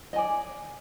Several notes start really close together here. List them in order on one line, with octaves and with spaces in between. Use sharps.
D#5 G#5 D5